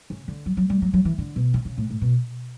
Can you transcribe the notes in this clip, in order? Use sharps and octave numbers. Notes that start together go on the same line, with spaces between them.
C#3
D3
F#3
F#3
G3
F#3
F#3
E3
D3
B2
C#3
C#3
A2
A2
B2